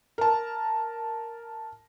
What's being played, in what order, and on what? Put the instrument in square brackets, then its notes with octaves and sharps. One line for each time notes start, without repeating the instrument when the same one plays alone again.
[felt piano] A#4 A5